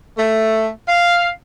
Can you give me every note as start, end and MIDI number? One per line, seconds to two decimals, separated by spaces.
0.18 0.67 57
0.87 1.27 77